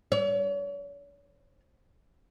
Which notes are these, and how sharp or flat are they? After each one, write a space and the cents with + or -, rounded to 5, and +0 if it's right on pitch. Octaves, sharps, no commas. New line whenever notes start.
C#5 +45